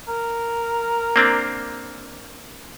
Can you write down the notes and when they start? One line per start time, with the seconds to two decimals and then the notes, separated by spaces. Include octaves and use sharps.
0.08 A#4
1.16 A#3 C4 D4